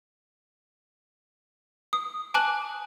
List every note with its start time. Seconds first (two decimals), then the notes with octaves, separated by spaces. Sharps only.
1.93 D#6
2.34 G#5 A5 D6 F#6 F#7